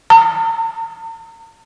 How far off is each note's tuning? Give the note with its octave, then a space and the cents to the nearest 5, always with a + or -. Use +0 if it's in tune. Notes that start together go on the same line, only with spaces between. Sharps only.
A#5 -40